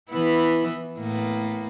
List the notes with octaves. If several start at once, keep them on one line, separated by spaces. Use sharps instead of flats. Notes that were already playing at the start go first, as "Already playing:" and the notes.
E3 B3 E4
A2 A#3 B3